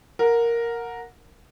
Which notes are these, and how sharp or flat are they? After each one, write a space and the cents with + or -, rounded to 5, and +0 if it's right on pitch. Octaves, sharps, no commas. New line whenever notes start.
A#4 +0 F#5 -20